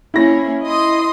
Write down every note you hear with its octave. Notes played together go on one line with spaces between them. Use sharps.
A#3 C#4 E4 A#6
D#5 C6 D#6